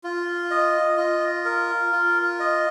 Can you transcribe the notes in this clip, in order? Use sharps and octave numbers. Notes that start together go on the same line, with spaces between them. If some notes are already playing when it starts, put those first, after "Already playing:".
F4
D#5
F4
A#4
F4
D#5